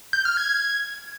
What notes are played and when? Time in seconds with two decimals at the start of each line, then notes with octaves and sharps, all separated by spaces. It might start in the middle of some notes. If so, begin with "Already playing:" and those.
0.13 G6
0.25 F6
0.37 G#6